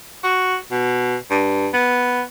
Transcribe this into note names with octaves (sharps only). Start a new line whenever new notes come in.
F#4
B2
G2
B3